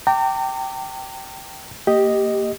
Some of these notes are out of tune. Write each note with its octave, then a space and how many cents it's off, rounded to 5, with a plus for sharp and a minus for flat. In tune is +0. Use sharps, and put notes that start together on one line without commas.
G5 -15 A#5 -40 D6 -5
A#3 -25 G4 +0 D#5 +0